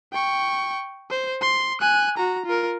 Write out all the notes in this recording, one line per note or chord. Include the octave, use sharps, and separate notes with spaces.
G5 C#6
C5
C6
G#5 F#6
F#4 A#5
F4 A#4